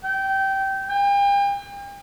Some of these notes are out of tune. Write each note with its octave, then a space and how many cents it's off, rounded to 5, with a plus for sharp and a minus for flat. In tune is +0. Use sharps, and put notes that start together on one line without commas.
G5 -20
G5 +40